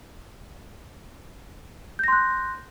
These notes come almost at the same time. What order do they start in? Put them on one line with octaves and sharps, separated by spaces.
G6 A#6 C6 F#6